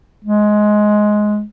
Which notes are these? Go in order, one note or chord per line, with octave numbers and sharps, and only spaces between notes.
G#3